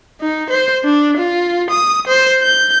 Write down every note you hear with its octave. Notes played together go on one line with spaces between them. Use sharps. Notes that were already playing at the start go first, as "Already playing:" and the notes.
D#4
C5
D4
F4
D#6
C5
G6